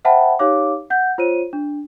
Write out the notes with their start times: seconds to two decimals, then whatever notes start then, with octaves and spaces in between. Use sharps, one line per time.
0.05 C5 E5 F#5 G5 A5 B5
0.39 D#4 G4 C#5 F5 D6
0.90 F#5 G6
1.18 F4 C5 C#5 D#7
1.53 D4